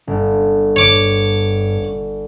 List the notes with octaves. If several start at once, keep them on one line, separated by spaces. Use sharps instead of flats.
G1
G2 C#5 D6